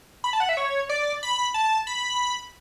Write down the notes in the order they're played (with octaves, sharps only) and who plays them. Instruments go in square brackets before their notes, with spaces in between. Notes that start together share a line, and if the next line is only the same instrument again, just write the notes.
[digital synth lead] B5
A5
F#5
E5
C#5
D5
B5
A5
B5